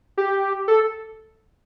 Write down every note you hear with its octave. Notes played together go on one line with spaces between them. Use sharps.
G4
A4